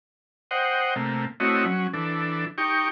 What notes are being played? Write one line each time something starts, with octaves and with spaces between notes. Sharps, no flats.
C5 D#5 F#5 G5
C3 A3 A#3
A3 C4 E4 F#4 C#5 D#5
F#3 C#4
E3 D4 A4
D#4 G4 G5 C#6